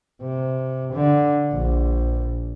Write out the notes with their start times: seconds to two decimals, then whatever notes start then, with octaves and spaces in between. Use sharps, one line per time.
0.22 C3
0.93 D3
1.53 A#1